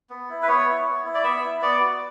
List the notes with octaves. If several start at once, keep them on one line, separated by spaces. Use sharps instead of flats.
B3
E4
B4
B3 C#5
E4
B3
E4
D5
B3 E5
E4
B3 D5
F#4